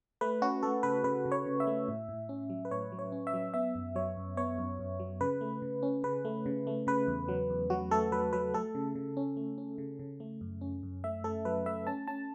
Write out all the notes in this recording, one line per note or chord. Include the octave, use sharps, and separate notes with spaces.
A3 B4
C#4 F#4
A3 A4
C#3 B4
C#3 B4
C#3
C#5
C#3
E5
A3
A2
A2
C#4
F#3
B4
A2 C#5
F#3
C#5
C#4
E5
F#3
B3 E5
F#2
F#3 C#5
F#2
B3 C#5
F#2
F#2
F#3
C#3 B4
A3
C#3
C#4
C#3 B4
A3
C#3
A3
C#3 B4
E2
F#3
E2
F#3 F#4
A3 A4
F#3 B4
F#3 B4
A3 A4
C#3
C#3
C#4
A3
C#4
C#3
C#3
A3
F#2
C#4
F#2
A3 E5
A3 A4
F#3 B4
A3 E5
C#4 A5
C#4 A5